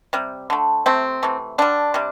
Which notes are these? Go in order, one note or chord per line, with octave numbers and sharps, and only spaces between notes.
C3 G3
D3 A3
C3 A3 C4
C3 E3 A3
D3 G3 D4
C3 G3